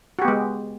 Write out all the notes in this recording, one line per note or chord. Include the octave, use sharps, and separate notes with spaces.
G#3 B3 F#4 G4